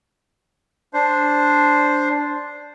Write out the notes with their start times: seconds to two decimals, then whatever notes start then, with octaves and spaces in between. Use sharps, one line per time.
0.94 D4 C5